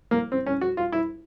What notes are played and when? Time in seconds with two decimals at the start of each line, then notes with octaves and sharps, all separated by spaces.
0.11 A#3
0.32 C4
0.46 C#4
0.61 F#4
0.77 F4
0.92 E4